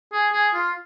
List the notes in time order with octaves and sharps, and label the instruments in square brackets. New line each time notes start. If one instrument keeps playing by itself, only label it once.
[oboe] G#4
G#4
F4